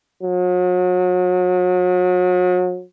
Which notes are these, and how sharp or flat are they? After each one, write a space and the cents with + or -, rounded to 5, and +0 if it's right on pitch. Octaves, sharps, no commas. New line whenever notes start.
F#3 -35